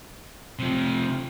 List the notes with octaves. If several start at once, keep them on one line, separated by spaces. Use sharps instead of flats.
C3 F3